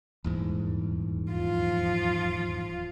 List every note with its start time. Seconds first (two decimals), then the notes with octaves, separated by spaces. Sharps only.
0.24 D#1 E2 G#2
1.31 F3 F4